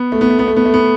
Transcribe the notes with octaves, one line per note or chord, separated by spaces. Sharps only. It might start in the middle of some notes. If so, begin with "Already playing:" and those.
Already playing: B3
A3
B3
A3
B3
A3
B3
A3
B3